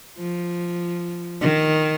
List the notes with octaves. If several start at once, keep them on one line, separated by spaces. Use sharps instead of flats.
F3
D#3